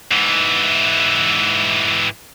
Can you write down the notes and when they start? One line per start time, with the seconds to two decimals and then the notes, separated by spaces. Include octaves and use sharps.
0.11 G#2 E3